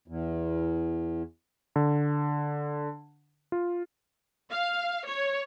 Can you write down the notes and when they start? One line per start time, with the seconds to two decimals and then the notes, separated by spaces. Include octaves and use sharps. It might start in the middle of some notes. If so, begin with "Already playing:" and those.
0.08 E2
1.76 D3
3.52 F4
4.49 F5
5.05 C#5